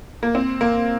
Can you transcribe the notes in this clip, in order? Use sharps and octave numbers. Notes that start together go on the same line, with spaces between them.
A#3
C4
A#3